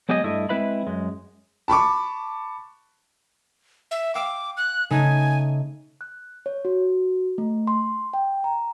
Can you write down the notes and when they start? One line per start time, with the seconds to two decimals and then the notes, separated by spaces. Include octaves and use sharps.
0.09 F#3 G#3 B3 G4 G#4 D#5
0.24 G2 A3 E4 D#5
0.49 G#3 C4 E4 B4 E5 B5
0.87 F#2 G#3
1.68 A5 B5 C#6 D6
3.91 E5
4.15 F5 G5 D6 E6
4.57 F#6
4.90 C#3 A3 D#4 G#5
6.01 F#6
6.46 C#5
6.65 F#4
7.38 A3
7.67 C6
8.14 G5
8.44 A#5